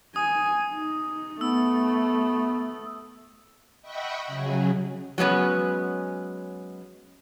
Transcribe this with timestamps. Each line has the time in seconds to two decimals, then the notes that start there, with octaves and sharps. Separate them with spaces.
0.16 G#5 D#6
0.73 D#4
1.41 A3 B3 E6
3.82 D#5 E5 F#5 G5 B5 C#6
4.27 C#3 F#3 G#4
5.18 F#3 G#3 B3 C#4